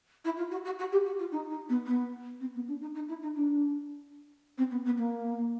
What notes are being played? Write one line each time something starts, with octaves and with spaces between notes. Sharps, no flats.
E4
F4
F#4
F#4
F#4
G4
F#4
F4
D#4
D#4
B3
B3
C4
B3
D4
D#4
D#4
E4
D#4
D4
C4
B3
B3
A#3